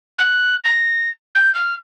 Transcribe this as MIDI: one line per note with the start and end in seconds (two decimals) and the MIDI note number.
0.18 0.55 90
0.64 1.09 94
1.35 1.52 91
1.54 1.74 89